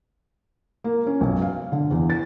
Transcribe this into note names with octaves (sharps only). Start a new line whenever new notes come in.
A#3
C#4
B1
F5
D3
E2
A6